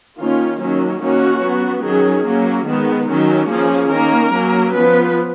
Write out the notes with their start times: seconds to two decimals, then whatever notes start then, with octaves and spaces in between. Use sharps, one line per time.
0.19 D#3 A#3 C#4 F4
0.60 D#3 F#3 A#3 C#4
1.01 D#3 A#3 C#4 F#4
1.43 F#3 B3
1.84 D#3 F#3 C#4 G#4
2.26 F#3 A#3 C#4
2.67 D#3 G#3 B3
3.09 D#3 F#3 C#4
3.50 F3 A#3 C#4 G#4
3.92 D#3 A#3 C#4 A#4
4.33 F#3 A#3 C#4
4.74 F3 B3 B4